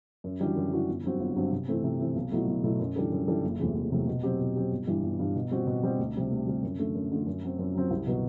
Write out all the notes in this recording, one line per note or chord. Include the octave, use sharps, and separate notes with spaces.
F#2
E3 G3 D4 F#4
F#2
E3 G3 D4 F#4
G1
G2 F#3 C4 F#4
G1
G2 F#3 C4 F#4
C3
E3 A3 C4
C3
E3 A3 C4
B1
B2 F#3 A3 E4
B1
B2 F#3 A3 E4
F#2
E3 G3 D4 A4
F#2
E3 G3 D4 A4
F#1
E2 C3 F#3 A3
F#1
E2 C3 F#3 A3
B2
F#3 C4 G4
B2
F#3 C4 G4
G1
G2 E3 G3
G1
G2 E3 G3
B2
G3 C4 F#4
B2
G3 C4 F#4
D2
C3 G3 C4
D2
C3 G3 C4
F#2
D3 A3
F#2
D3 A3
F#2
F#3 C4
F#2
F#3 C4
C2
B2 F#3 B3 F#4